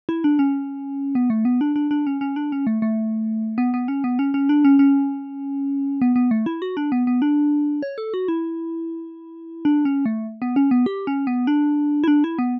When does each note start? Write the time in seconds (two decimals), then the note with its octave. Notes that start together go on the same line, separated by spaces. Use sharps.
0.09 E4
0.24 D4
0.39 C#4
1.15 B3
1.30 A3
1.45 B3
1.61 D4
1.76 D4
1.91 D4
2.07 C#4
2.21 C#4
2.36 D4
2.52 C#4
2.67 A3
2.82 A3
3.58 B3
3.74 B3
3.88 C#4
4.04 B3
4.19 C#4
4.34 C#4
4.49 D4
4.65 C#4
4.79 C#4
6.02 B3
6.16 B3
6.31 A3
6.46 E4
6.62 F#4
6.77 D4
6.92 B3
7.07 B3
7.22 D4
7.83 C#5
7.98 A4
8.14 F#4
8.28 E4
9.65 D4
9.85 C#4
10.06 A3
10.42 B3
10.56 C#4
10.71 B3
10.86 G4
11.07 C#4
11.27 B3
11.47 D4
12.04 E4
12.08 D4
12.24 E4
12.39 B3